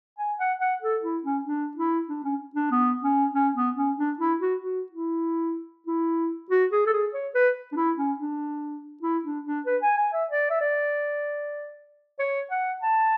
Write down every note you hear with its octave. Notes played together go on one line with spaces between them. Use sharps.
G#5
F#5
F#5
A4
E4
C#4
D4
E4
D4
C#4
D4
B3
C#4
C#4
B3
C#4
D4
E4
F#4
F#4
E4
E4
F#4
G#4
A4
G#4
C#5
B4
D4
E4
C#4
D4
E4
D4
D4
B4
G#5
G#5
E5
D5
E5
D5
C#5
F#5
A5